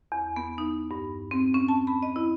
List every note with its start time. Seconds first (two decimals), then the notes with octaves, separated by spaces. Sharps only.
0.12 E2
0.36 B3
0.58 D#4
0.91 G2
1.31 C4
1.54 C#4
1.68 A5
1.87 B5
2.03 D#5
2.16 E4